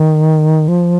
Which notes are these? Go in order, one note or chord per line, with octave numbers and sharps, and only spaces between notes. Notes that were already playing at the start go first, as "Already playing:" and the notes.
Already playing: D#3
F3